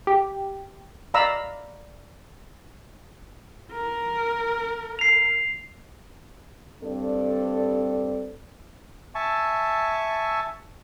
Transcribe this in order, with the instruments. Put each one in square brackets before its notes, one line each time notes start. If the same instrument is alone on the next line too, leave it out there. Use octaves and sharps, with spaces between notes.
[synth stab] G4
[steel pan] D5 F5 A#5 B5 E6
[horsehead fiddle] A#4
[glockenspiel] C7 F7
[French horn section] G2 C4 A4 D5
[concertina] E5 G#5 A5 C#6